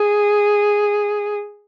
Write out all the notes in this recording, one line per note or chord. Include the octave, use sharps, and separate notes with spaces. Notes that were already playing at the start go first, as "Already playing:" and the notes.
Already playing: G#4